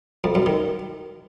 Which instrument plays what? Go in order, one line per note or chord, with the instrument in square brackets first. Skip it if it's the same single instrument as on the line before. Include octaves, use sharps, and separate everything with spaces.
[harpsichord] F2
F#2
D#3